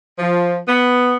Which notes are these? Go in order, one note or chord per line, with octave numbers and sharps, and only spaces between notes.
F3
B3